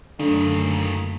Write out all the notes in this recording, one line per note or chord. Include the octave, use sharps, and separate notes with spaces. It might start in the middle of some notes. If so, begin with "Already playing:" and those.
F#2 A#2 D3 D#3 A3